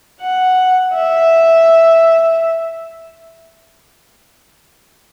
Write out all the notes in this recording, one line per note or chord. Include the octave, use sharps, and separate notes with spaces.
F#5
E5